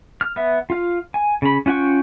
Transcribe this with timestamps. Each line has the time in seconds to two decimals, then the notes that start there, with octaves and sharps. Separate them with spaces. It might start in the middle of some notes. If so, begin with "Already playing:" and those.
0.21 F6
0.36 B3 E5
0.70 F4 F5
1.14 G#5
1.42 C#3 B5
1.66 C#4 F4 F#5 G5 C#6